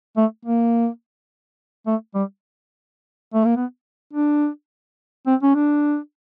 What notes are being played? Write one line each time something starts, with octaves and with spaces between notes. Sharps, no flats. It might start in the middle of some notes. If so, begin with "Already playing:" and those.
A3
A#3
A3
G3
A3
A#3
B3
D4
C4
C#4
D4